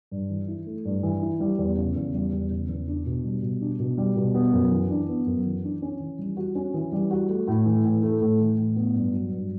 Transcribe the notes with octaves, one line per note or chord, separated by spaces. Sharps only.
G2
E3
E4
A3
G2
E3
E4
G3
E2
C#3
E2
G3
E2
C#3
E2
D4
B2
G3
B2
D4
B2
G3
B2
B3
F#2
E3
D4
B3
F#2
E3
D4
C#4
E3
G3
F#4
C#4
E3
G3
F#4
A3
A2
E3
A2
A3
A2
E3
A2
B3
G2
F#3
G2